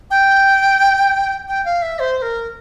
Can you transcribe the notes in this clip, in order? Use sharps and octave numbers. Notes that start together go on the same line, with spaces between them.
G5
G5
F5
E5
C5
C5
A#4